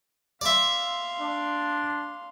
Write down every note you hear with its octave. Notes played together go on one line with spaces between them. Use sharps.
D5 E5 F5 C6
D4